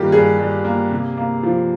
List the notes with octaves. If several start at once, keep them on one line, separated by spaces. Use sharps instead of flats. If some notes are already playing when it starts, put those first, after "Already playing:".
Already playing: G2 D#3 A#3 F4 G4
G2 G#4
G2
A#3
C3
A#3
F3